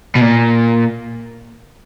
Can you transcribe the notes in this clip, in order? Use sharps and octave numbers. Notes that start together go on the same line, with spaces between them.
B2
A#2